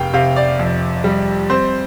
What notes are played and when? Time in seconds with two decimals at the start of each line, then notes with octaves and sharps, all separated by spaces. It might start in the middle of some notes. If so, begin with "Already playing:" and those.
Already playing: F1 F5 G5
0.13 C3 F5
0.36 D5
0.59 F2
1.04 G3
1.50 C4 C5